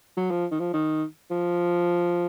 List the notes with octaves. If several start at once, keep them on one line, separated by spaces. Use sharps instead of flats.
F#3
F3
D#3
F3
D#3
F3